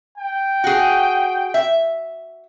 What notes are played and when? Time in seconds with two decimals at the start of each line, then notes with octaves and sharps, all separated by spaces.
0.18 G5
0.64 F#4 G#4
1.54 E5